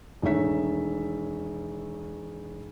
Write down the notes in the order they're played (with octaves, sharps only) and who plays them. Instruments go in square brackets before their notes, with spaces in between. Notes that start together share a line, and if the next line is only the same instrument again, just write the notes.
[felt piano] E1 D#3 A3 C#5 E5 B6